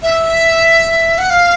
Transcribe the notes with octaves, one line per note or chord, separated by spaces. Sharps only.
E5
F#5
F5